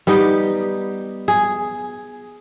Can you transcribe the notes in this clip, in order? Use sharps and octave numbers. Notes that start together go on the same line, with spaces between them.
G3 B3 D#4 G4
G#4